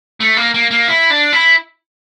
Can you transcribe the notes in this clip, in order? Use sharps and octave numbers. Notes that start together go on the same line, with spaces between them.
A3
A#3
A#3
A#3
E4
D4
E4